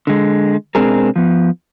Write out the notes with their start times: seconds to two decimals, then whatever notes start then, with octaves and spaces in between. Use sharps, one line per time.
0.07 D3 G#3
0.75 B2 G#3 C4 D4 G#4 A#4
1.16 F3 B3